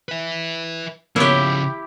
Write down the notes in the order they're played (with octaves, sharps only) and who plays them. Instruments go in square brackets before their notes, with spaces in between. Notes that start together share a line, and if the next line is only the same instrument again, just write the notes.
[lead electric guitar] B4 E5
[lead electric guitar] C#3 F3 [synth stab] A#3 B3 C#5 [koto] E4 G4